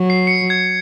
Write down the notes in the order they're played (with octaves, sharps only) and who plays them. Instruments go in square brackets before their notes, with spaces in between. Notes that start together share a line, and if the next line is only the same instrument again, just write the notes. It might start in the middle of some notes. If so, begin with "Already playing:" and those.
Already playing: [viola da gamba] F#3
[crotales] C7
C#7
G#6